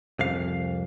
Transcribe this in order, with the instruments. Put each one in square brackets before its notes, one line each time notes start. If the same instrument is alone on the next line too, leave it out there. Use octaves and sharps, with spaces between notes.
[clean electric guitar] C2 F2 F5